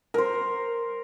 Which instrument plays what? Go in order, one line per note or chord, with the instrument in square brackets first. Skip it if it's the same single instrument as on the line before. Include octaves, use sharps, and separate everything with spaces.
[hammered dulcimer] A#4 C5